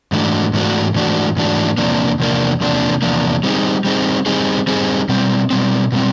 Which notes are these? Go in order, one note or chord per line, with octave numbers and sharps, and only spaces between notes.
G#2 E3 A3 D4 F#4
G#2 E3 A3 D4 F#4
G#2 E3 A3 D4 F#4
G#2 E3 A3 D4 F#4
E2 C3 F3 A#3 D4
E2 C3 F3 A#3 D4
E2 C3 F3 A#3 D4
E2 C3 F3 A#3 D4
G3 C4 D#4 G#4
G3 C4 D#4 G#4
G3 C4 D#4 G#4
G3 C4 D#4 G#4
B2 G3 C4
B2 G3 C4
B2 G3 C4